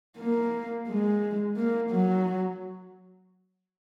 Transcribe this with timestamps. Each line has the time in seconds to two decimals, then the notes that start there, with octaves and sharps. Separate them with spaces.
0.18 A#3
0.88 G#3
1.56 A#3
1.91 F#3